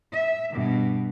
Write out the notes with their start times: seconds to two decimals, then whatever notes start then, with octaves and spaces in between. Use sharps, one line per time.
0.12 E5
0.51 G2 B2